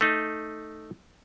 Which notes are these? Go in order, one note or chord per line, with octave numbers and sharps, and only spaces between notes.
A3 D#4